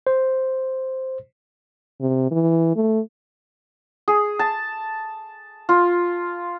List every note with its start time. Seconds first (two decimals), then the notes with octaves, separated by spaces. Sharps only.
0.07 C5
2.01 C3
2.31 E3
2.76 A3
4.08 G#4
4.39 A5
5.69 F4